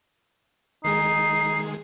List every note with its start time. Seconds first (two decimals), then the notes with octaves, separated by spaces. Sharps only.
0.84 D#3 G#3 D#4 G#4 C7